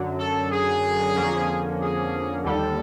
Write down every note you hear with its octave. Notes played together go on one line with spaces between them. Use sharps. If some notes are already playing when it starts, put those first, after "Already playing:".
Already playing: F#2 D3 F#3
A4
G#4
F2 D3 F3 A#3 C#4
G#4
D#2 D3 G3 A4